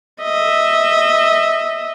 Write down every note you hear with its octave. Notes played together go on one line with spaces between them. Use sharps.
D#5 E5